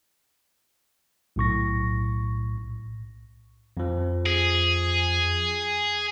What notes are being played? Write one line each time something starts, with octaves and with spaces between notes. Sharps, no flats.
B1 A2 C#6 A#6
F2 F3
G#4